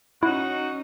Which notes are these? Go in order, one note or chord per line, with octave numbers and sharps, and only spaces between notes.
C#4 D#4 E4 F#4